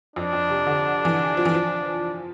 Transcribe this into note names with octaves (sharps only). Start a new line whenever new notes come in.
F2 D4
F2
C3
D3
E3
F3
E3
F3